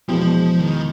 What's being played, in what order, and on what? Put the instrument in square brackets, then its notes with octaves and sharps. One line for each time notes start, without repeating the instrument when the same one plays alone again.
[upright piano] E2 B2 G#3 [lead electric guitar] F3
[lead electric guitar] D#3